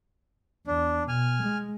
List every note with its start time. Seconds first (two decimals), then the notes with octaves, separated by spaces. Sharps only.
0.67 E2 D4
1.08 B2 G#5 F6
1.44 G#3